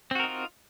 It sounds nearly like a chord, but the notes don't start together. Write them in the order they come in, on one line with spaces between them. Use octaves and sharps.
C4 F#4 A#4 D#4 F4